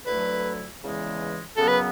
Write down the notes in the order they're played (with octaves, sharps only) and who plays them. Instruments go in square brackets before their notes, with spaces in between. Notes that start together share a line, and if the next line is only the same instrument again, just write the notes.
[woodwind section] D2 D3 F#3 A3 E4 [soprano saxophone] B4
[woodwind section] E2 C#3 E3 G#3
[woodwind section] F#2 C#3 F#3 B3 [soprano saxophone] A4
[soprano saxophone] B4